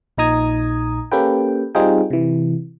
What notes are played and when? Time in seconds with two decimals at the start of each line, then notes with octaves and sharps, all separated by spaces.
0.17 A#1 A#2 D#4 A#5 D#6 G#6
1.12 A#3 C#4 G4 A4 B4 G5
1.75 G3 C4 D#4 F4 G#4 G5
2.10 C3 E3